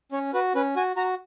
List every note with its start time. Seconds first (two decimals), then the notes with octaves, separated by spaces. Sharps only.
0.12 C#4 C#5
0.33 F#4 B4
0.55 C#4 B4
0.76 F#4 G#5
0.96 F#4 A#5